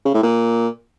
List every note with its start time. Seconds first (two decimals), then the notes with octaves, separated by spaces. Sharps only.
0.05 C#3
0.14 A2
0.23 A#2